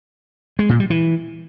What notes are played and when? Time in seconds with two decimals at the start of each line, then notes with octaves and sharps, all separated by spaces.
0.59 G#3
0.69 A#2
0.80 G3
0.90 E3